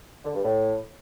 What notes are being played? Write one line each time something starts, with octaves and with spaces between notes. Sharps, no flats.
D3
G2
A2